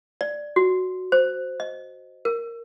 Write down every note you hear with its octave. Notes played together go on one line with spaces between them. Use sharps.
D5
F#4
C5
D#5
A#4